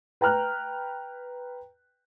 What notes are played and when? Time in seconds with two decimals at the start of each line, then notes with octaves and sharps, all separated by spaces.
0.21 B4 G5 A#5 F6 F#6